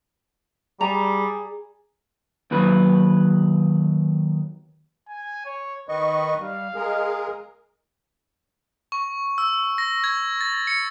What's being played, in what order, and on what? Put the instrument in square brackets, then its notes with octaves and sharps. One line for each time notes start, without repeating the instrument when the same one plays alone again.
[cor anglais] G3 [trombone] G#4 [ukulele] A#5
[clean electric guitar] D#2 D#3 F#3 B4
[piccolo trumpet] G#5
C#5
[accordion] D#3 D#5 C#6 [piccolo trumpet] B4
[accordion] G3 [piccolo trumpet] F5
[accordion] G#3 G#4 A#4
[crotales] C#6
E6
A#6
G#6
A6
C#7